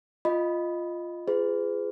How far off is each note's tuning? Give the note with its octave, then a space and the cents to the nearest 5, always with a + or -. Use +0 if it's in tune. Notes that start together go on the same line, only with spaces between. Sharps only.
F4 +0 D#5 +0 B5 +0
F4 -15 G#4 +0 B4 +40